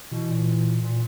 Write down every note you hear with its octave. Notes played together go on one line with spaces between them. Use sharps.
B2 E3
A#2
A#2